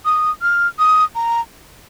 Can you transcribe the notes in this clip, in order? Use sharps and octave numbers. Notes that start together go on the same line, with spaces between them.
D#6
F6
D#6
A#5